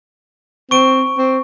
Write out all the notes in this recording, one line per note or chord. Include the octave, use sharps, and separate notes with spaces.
C4 C#6 D7
C4